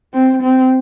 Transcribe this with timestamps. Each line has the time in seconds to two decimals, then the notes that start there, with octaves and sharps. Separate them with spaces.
0.14 C4
0.43 C4